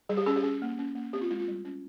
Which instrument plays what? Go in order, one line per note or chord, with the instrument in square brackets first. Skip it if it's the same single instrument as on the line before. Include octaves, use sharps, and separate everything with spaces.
[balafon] G3 G#4
G4
C#4 G#4
G4
C#4 G#4
A#3
C#4
A#3
C4 G4
F4
G#3 E4
F4
G3
C#4